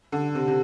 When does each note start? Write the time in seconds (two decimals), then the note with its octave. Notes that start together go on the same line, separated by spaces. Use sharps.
0.12 D3
0.35 C3
0.48 C3